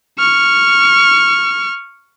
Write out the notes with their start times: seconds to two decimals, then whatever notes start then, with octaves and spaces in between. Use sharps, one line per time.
0.19 C#6 F6